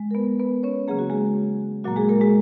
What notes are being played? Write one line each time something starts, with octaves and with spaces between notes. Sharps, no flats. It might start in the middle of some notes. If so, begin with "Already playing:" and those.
Already playing: G#3
A#4
B3 B4
B3 B4
C#4 C#5
C#3 F#3 A#3 G#4
F#4
G#3 G#4
A#2 F#3 A#3 F#4
G#3 G#4
A#3 A#4
G#3 G#4